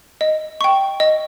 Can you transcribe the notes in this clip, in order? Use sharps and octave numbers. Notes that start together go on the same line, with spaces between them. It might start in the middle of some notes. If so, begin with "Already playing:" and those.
D#5
G5 C#6
D#5